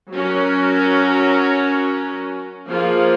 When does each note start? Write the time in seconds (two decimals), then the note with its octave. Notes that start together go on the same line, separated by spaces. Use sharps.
0.12 F#3 C#4 F#4 A#4
2.67 F3 A#3 F4 G#4